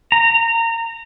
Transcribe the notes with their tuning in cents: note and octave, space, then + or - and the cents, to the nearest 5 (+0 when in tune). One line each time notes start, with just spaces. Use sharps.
A#5 -25